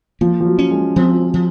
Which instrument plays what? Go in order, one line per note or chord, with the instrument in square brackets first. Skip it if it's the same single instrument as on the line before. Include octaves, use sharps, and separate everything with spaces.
[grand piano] F3 [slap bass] A#3
[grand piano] F3
F#3
[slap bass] C#4
[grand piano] G#3
[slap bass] F3 [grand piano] C4
[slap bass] F3